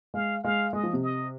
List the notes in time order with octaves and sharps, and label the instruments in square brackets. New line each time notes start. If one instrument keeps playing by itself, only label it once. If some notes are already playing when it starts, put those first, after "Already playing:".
[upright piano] G#3 [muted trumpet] F5
[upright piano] G#3 [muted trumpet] F5
[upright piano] G#3 [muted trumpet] D#5
[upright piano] F3
C3
[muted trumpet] D#5